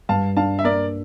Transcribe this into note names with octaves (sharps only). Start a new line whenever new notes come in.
G2 F5 A5
D4 F5 A5
E5
A#3 A#4 D5